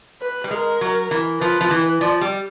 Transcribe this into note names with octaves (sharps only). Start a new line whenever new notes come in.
B4
G3
G#3 A#4
F#3
E3
F3 B4
F3
E3
F3 D5
G3